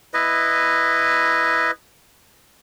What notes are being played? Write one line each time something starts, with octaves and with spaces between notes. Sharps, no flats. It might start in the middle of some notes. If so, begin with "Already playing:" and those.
E4 B4 D#5